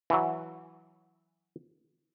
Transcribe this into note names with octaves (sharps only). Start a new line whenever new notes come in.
E3 F#3